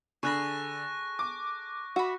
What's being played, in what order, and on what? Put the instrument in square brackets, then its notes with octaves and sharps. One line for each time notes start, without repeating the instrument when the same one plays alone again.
[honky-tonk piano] D3 [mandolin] G#4 A4 B5 [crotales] C#6 F#6 A#6
[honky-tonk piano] D6
[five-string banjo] F#4 [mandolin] E5 B5